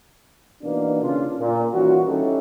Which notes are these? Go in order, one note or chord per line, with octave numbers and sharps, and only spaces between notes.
B2 E3 A#3 B3 D4 D#4
C#3 C#4 D4 F4
A#2
D#3 E3 G3 C#4 F4 F#4
G3 C#4 D#4 E4 G4 A4